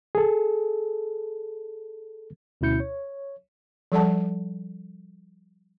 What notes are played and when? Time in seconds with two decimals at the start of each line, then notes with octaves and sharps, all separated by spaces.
0.15 G#4 A4
2.61 D2 B2 C#4 E4 G6 C#7
2.80 C#5
3.92 F3 G3 A4 D5 F#5 A5